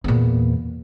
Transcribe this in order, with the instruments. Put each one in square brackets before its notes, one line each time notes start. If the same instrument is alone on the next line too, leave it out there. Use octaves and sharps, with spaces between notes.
[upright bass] E2 A#2